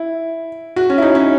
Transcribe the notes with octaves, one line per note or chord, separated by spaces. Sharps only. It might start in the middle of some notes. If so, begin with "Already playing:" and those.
Already playing: E4
F#4
C#4
E4
D#4
C#4